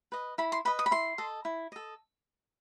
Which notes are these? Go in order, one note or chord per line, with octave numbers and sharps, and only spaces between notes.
B4 D#5
E4 B5
C6
B4 D#5 B5
D#6
B5
E4 C6
A4 D#5
E4
A4 D#5